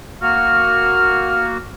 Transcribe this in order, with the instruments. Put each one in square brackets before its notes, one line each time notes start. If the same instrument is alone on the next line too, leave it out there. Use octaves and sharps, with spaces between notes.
[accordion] A#3 F#4 [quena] F6